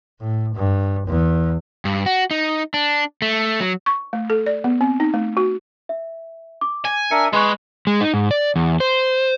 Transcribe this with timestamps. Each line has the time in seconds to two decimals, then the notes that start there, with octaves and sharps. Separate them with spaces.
0.21 A2
0.55 G2
1.08 E2
1.85 G2
2.06 F#4
2.31 D#4
2.74 D4
3.22 A3
3.60 F#3
3.86 C#6
4.13 A3
4.30 A4
4.46 D5
4.64 B3
4.81 C4
5.00 D#4
5.14 A3
5.37 F#4
5.89 E5
6.61 D6
6.85 G#5
7.11 D4 A#4 E5 C#7
7.33 G#3 G#4 B4 C6 C#6
7.87 G#3
8.01 D#4
8.14 G#2
8.31 D5
8.56 E2
8.80 C5